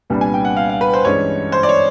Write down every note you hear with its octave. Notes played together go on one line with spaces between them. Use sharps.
C2 A#2 G3 B3 D4
G#5
G5
F#5
F5
F5
B4
C5
G2 E3 G#3 C#4 C#5
C5
D5
C#5